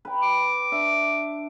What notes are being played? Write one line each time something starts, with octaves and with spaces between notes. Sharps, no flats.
B4 G5
D6
D4 E5